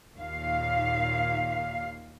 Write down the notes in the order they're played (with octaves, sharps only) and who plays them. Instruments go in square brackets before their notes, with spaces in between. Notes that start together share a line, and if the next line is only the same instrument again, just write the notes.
[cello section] D#2 A#2 F5